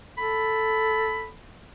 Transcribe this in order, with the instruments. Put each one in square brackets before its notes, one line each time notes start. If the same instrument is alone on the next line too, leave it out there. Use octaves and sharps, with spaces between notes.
[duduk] A4 [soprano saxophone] B5